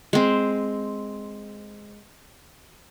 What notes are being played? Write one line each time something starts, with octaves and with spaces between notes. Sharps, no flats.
G#3 C4